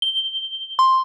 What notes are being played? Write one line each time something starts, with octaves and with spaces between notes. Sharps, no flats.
G7
C6